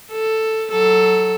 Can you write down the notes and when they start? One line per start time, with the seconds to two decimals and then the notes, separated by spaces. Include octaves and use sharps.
0.12 A4
0.71 F#3 A4